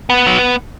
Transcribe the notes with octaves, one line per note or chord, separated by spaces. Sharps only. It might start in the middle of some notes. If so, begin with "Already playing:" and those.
B3
F#3